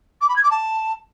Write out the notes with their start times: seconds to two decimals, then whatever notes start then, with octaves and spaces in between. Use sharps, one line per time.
0.20 D6
0.28 B5
0.35 G#6
0.43 D6
0.50 A5